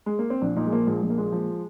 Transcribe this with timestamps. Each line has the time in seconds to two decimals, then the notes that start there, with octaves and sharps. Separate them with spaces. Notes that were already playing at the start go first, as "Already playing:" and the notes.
0.06 G#3
0.19 A#3
0.30 C4
0.41 A#1 D4
0.57 A#2 D#4
0.67 G#3
0.72 F3 A#3
0.87 A#1 G#3
1.02 A#1 G#3
1.10 A#3
1.18 A#2 G#3
1.32 F3